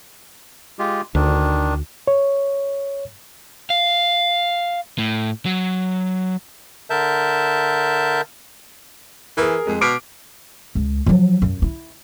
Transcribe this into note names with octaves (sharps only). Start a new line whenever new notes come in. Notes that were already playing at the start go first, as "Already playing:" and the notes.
G#3 F4 G4
D2 D#3 D4
C#5
F5
A2
F#3
D3 A#4 E5 A5 G6
E3 G#4 A#4
F2 G#3
B2 D6 F6 D7
C#2
F3 F#3
F#2
E4